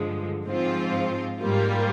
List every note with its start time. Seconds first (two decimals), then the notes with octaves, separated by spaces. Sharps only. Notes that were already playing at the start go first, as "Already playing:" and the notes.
Already playing: G2 D3 F3 G#3
0.46 G#2 F3 C4 F4
1.40 G#2 G3 A#3 F4